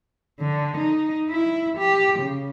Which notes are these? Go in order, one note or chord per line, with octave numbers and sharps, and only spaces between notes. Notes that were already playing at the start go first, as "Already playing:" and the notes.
D3
D#4
E4
G4
C#3